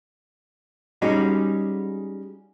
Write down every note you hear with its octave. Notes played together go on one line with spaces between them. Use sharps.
G3 G#3 C#4 D#4 F#4